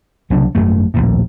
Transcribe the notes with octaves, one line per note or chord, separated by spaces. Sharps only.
C2 C#3 F#3 D4
G#1 F#2 A3
A#1 D#2 A2